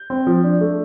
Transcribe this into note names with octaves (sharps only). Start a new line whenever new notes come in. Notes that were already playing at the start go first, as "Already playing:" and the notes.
Already playing: G6
C4
F3
D4
A3